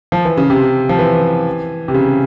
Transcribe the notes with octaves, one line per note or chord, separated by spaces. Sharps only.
F3
E3
C#3
C3
F3
E3
C3
C#3